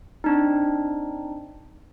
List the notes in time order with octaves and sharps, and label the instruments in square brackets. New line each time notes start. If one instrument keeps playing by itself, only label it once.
[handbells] C4 D4 D#4